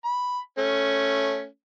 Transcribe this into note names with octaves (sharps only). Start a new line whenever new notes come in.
B5
A3 C#4